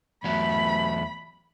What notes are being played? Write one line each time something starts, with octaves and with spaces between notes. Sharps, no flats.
E2 F#3 A3 B5